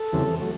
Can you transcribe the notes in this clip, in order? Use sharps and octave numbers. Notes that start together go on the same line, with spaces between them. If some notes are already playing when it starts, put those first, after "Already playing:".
Already playing: A4
E2 C#3 E3 G3 C4
F#3 A3